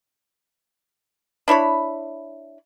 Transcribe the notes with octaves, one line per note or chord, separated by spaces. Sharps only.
D4 E4 C#5 B5